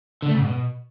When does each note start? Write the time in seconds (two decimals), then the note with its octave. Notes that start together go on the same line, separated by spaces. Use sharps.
0.22 D3
0.28 A3
0.34 C#3
0.39 G#2
0.45 B2